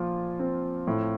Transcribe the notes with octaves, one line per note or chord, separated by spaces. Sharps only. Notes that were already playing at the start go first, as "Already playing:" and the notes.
Already playing: A#2 F3 F4
C4
A2